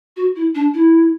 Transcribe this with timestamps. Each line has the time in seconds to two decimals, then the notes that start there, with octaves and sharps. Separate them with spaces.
0.16 F#4
0.36 E4
0.55 D4
0.74 E4